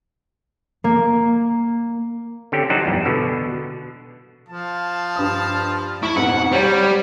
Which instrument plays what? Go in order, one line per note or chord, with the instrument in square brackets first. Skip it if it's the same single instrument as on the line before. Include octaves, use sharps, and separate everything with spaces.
[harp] A#3
[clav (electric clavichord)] D3 C4 C#4 G4
F#3 D4 D#4 G4 C5 F#5
E2 G2 A#2
B2 D3
[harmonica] F3 F5 A5
[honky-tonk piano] G2 D#6
[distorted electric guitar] E4 [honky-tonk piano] C#6
[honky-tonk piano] F2 G#2 B2 [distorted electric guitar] F#5
[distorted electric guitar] G3 [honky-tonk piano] C5 C#5